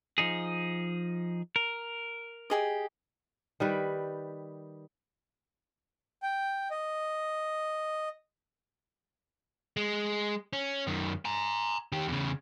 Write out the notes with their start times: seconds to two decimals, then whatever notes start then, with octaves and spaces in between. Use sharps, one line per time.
0.18 F3 D#4 G#4
1.56 A#4
2.50 G4 G#4 D#5
3.60 D#3 G3 B4
6.23 G5
6.71 D#5
9.77 G#3
10.53 C#4
10.87 F#2 D#3
11.25 G#5 A#5
11.92 D#3 G4
12.08 E2 C#3